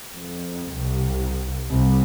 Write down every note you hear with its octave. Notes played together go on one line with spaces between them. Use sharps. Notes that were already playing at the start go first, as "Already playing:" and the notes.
F2
C2
C2